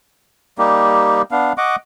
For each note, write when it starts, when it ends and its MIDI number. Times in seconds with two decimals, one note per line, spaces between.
0.58 1.22 55
0.58 1.22 58
0.58 1.22 63
0.58 1.22 67
1.31 1.53 59
1.31 1.53 62
1.31 1.53 77
1.58 1.76 75
1.58 1.76 78
1.58 1.76 85
1.58 1.76 86